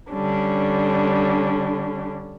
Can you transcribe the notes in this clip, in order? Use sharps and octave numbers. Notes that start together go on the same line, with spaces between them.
D3 G3 C#4 D4